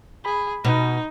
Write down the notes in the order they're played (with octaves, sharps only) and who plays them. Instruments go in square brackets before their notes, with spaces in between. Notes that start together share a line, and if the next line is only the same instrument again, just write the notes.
[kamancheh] G#4 [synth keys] B5
[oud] B2 [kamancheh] D#4